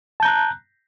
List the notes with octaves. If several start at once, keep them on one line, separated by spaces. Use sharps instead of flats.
A5 A#5 F#6 G6